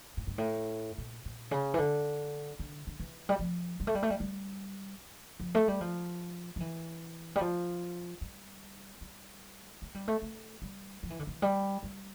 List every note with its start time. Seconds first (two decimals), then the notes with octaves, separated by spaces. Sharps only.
0.17 A2
0.27 G2
0.38 A2
0.98 A#2
1.25 A#2
1.51 C#3
1.74 E3
1.78 D3
2.59 D3
2.87 D3
3.00 E3
3.29 G3
3.39 F3
3.80 G3
3.87 A3
3.95 G3
4.03 A3
4.10 G3
4.20 G3
5.40 F3
5.55 A3
5.68 G3
5.81 F3
6.56 F3
6.60 E3
7.36 G3
7.41 F3
8.21 G3
9.01 G3
9.82 A3
9.95 G3
10.08 A3
10.22 A3
10.62 G3
11.03 F3
11.10 E3
11.19 D3
11.27 E3
11.42 G3
11.83 G3